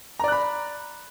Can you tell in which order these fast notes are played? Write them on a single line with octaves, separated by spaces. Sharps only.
A#5 D5 F#6 B5